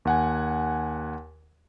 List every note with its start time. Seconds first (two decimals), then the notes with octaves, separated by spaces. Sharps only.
0.05 D#2 F#5 G#5